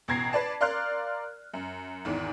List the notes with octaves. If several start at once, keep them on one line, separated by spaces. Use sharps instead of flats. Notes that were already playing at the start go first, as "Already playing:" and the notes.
A1 B2 A#5 G#6 A#6 C7
B4 D5 A5
A#4 D5 F5 C6 F6 F#6
F#2
G#1 E2 G#2